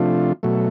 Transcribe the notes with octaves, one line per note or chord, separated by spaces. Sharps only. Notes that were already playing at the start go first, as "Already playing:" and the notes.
Already playing: C3 F3 A3 D4 F4
B2 F#3 A3